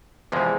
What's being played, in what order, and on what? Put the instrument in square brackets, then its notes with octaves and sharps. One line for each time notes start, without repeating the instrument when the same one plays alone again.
[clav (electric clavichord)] E2 C3 F3 G#3